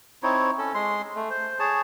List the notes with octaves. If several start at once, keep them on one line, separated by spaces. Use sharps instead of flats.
C4 D#4 E4 C#5
C#4 A4
G#3 C6
A3
C5
G#4 C#5 A5